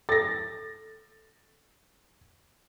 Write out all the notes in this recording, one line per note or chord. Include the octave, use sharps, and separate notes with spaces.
A4 A6 A#6